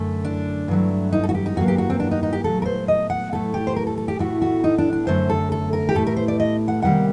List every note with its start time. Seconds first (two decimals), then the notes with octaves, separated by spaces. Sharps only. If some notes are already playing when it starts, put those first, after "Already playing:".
Already playing: F#2 D3 A3
0.25 D4
0.68 G2 F#3 A3
1.13 D#4
1.24 A4
1.29 F#4
1.35 G4
1.46 D#4
1.56 G2 F#3 A#3 F#4
1.68 G4
1.78 F#4
1.90 C4
2.00 D4
2.11 D#4
2.23 D#4
2.33 G4
2.44 A#2 F#3 A3 A4
2.62 A#4
2.66 C5
2.88 D#5
3.10 F#5
3.32 A2 F#3 A3 A4
3.54 G4
3.67 C5
3.76 A#4
3.87 A4
3.98 A4
4.08 G4
4.19 A2 A3 F#4
4.42 F#4
4.64 D#4
4.78 D4
4.93 D4
5.07 F#2 D3 F#3 A3 C5
5.30 A4
5.52 A4
5.73 A#4
5.89 G4
5.95 A2 A3 A4
6.07 A#4
6.16 C5
6.28 D5
6.40 D#5
6.68 F#5
6.82 C3 D#3 G3 A#3 F#5